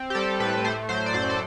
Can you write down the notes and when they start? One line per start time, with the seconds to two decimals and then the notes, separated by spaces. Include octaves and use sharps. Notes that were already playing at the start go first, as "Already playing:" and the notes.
Already playing: C4
0.10 G4
0.15 G3 A4
0.40 A2 B4
0.64 A3 C5
0.89 F#3 C5
1.06 D5
1.14 F#2 C5
1.30 A4